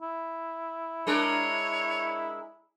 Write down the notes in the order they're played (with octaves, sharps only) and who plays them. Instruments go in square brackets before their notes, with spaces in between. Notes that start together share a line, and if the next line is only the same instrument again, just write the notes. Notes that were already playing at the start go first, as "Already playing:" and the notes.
[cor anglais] E4
[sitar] G#3 D4 A#4 [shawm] C#5